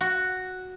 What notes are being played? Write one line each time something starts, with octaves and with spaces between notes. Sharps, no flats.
F#4